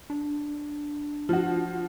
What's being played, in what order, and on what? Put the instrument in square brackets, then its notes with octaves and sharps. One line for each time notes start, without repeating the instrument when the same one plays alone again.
[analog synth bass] D4
[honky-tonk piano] F3 F#4